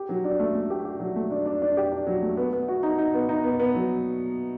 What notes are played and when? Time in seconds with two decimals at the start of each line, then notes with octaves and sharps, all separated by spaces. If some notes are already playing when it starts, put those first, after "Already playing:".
Already playing: G4
0.09 F#3
0.24 D4
0.39 A3
0.55 A3
0.70 G4
0.85 G4
1.00 F#3
1.16 A3
1.31 D4
1.46 D4
1.62 D4
1.77 G4
1.92 D4
2.07 F#3
2.22 A3
2.37 B3
2.53 B3
2.68 F#4
2.83 D#4
2.98 D#4
3.14 B3
3.29 D#4
3.44 B3
3.60 B3
3.75 F#3